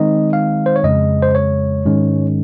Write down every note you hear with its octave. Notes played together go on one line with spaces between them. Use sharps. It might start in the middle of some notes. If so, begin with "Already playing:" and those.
Already playing: D#3 G#3 C4 D#4 D#5
F5
C5
C#5
F2 C#3 G#3 D#5
C5
C#5
G#2 D#3 G#3 C#4